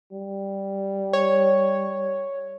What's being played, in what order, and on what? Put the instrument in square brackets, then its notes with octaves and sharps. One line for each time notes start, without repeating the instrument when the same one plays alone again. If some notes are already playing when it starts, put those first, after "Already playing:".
[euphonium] G3
[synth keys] C#5